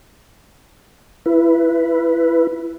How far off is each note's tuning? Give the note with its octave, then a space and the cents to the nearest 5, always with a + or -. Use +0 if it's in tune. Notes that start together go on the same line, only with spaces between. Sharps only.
E4 +20 B4 +0